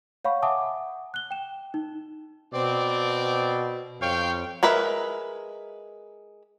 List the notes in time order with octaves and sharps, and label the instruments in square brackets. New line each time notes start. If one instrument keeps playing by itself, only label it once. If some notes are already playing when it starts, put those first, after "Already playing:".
[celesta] C#5 F5 F#5 B5 C#6
E5 F#5 G#5 A5 D6 D#6
F#6 G7
G5 E7
D#4
[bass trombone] B2 [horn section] C4 D5
[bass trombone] F2 [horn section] C#5 F5 G5
[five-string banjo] G#3 A#4 B4 E5